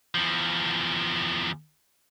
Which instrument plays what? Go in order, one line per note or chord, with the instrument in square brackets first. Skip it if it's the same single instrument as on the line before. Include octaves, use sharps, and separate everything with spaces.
[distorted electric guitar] E2 F3